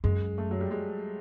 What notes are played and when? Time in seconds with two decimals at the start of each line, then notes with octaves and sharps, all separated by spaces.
0.04 F#2 G#3
0.38 A3
0.51 F#3
0.61 G3
0.71 G#3